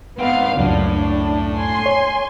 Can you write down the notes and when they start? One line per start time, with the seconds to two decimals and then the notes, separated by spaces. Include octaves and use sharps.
0.19 G#2 B3 C4 F5
0.57 C#2 F#2 A2 D4
1.57 G#5 C6
1.86 C#5